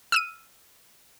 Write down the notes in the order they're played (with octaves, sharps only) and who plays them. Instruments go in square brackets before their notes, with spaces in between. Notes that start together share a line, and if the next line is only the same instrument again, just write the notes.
[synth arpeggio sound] E6 F6 D#7